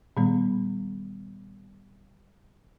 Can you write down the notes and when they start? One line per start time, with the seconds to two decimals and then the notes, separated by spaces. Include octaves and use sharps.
0.17 A#2 D#3 G3 B3